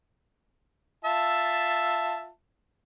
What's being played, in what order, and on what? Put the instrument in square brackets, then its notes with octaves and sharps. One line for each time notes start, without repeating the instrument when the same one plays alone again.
[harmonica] F4 E5 A5